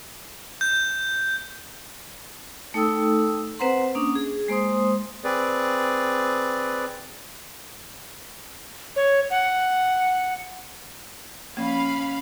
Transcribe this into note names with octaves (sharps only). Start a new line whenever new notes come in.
G6
A3 D#4 A4 G5 D#6 E6
C4 B4 C5 F#5 A#5 C6
A#3 C#4 D4 D#6
G#4
G#3 A#3 C5 C6 D#6
C4 G#4 B4 D5
C#5
F#5
F3 A#3 C#4 F5 B5